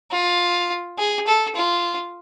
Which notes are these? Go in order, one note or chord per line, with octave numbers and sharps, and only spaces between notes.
F4
G#4
A4
F4